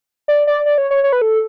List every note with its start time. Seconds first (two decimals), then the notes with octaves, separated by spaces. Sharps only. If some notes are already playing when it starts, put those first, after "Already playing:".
0.28 D5
0.47 D5
0.66 D5
0.78 C#5
0.91 C#5
1.04 C#5
1.13 B4
1.22 A4